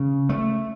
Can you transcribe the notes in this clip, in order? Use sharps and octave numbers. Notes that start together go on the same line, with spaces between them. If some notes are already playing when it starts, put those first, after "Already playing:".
Already playing: C#3
A3